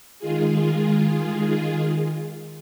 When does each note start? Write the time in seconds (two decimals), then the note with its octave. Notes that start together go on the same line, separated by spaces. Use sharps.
0.19 D#3 G#3 F4 G#4